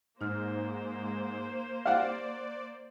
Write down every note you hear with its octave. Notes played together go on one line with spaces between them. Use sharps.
G#2 A#3 D#4 C5 F6
D5 F5 F#5